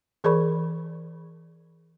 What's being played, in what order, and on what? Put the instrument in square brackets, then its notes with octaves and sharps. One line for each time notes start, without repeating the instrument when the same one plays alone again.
[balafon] E3 G#4 A#4 D5 B5 C#6